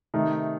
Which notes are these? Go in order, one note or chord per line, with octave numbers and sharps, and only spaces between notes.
C3 D#3 A3 D#4